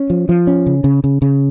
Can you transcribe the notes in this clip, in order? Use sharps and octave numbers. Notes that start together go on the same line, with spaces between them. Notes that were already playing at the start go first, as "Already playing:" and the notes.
Already playing: C#4
F3
F3
C#4
C#3
C#3
C#3
C#3